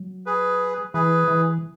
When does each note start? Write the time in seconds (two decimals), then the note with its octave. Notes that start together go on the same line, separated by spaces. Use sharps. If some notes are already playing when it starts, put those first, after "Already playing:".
Already playing: F#3
0.26 G#4 B4
0.94 E3 G#4 B4
1.28 E3